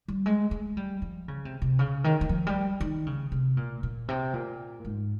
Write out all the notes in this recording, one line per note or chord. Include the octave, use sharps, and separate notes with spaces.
G3
G#3
G#3
G3
F3
C#3
C3
C3
C#3
D#3
D#3
F3
G3
D#3
C#3
C3
A#2
A#2
C3
A#2
G#2